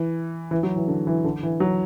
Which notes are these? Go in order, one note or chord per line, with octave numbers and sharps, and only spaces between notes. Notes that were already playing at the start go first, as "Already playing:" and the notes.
Already playing: E3
E3
F#3
E3
D3
E3
D3
E3
F#3